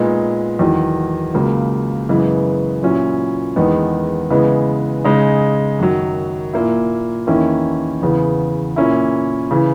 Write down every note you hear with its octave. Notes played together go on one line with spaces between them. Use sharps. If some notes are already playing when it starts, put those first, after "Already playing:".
Already playing: A#2 G#3 B3 D#4
E2 D#3 F#3
C#2 C#3 F#3 A#3
F#2 C#3 E3 G#3 B3
A#2 F#3 C#4 E4
E2 D#3 G#3 B3
C#3 E3 G#3 B3
C#3 G#3 D#4
F#2 D#3 F#3
A#2 A#3 E4
E2 D#3 A#3 C#4 E4
E2 C#3 E3 B3
A#2 A#3 C#4 E4
C#3 E3